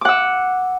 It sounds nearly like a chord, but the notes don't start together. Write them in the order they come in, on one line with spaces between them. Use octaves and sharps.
D6 F#5 E6